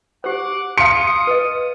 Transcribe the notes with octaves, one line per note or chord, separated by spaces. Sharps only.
G4 C5 F#5 D6
F5 C6 D#6 C#7
B4 D#5